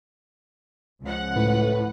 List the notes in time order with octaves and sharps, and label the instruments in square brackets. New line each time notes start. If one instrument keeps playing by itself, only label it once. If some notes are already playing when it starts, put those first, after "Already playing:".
[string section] C#2 F3 F#5
[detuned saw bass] A2 [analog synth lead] B4